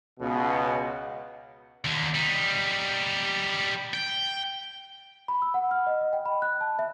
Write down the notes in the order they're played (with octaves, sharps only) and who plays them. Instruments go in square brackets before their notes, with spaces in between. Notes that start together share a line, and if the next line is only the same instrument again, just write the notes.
[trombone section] C#2 B2
[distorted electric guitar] D#2 D3
G3 D#4
G5
[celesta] B5
E6
F#5
F6
D#5
D#5
G5
B5
F#6
A5
E5